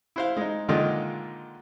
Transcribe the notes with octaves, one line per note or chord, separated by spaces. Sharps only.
E4 C5 F5
G#3 D#4
A#2 D3 D#3 G#3 D#4 F4